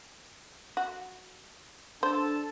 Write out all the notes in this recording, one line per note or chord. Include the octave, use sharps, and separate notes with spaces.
F#4
D4 A4 C5 A5